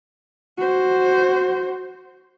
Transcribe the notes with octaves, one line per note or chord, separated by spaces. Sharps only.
F#4 C5